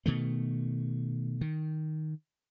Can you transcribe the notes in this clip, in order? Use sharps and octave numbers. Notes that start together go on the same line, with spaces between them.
B2 D#3 A3
D#3